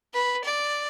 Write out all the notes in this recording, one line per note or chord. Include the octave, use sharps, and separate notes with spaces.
B4
D5